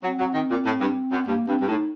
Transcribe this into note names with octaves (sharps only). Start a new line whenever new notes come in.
F#3 C4
F#3
D#3
A#2
A2
G2
F#2
G2 A#3
G2 C4
G2
A2 D#4